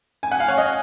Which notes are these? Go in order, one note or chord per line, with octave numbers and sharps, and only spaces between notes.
G#5
F#5
F5
C#5
D#5